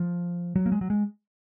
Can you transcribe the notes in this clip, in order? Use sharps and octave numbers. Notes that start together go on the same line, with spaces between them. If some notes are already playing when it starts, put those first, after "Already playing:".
Already playing: F3
F#3
A#3
G#3
F#3
G#3